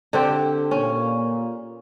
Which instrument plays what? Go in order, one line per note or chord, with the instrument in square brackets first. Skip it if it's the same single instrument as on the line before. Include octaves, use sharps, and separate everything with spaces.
[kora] D3 C4 G4
[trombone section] A#2 [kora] C#4